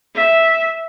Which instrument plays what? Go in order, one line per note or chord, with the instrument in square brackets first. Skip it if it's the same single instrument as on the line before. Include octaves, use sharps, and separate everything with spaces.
[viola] E5